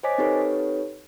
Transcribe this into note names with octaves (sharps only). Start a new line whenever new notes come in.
C5 C#5 D#5 G#5 D6 B6
C4 D#4 G4 A4 B4 C#5